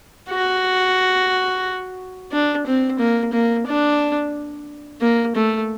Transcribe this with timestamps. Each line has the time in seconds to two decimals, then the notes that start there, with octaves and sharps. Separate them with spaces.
0.30 F#4
2.32 D4
2.66 C4
2.99 A#3
3.33 A#3
3.67 D4
5.01 A#3
5.35 A3